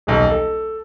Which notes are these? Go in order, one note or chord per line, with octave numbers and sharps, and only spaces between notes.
D#1 B1
A4